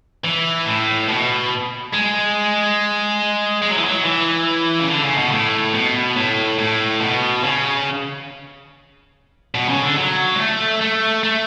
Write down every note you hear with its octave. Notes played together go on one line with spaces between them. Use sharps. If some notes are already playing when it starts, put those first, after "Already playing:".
E3
A2
B2
G#3
G#3
F#3
E3
F#3
E3
C#3
D3
C#3
B2
A2
B2
A2
A2
B2
C#3
B2
C#3
D3
F#3
G#3
A3
A3
A3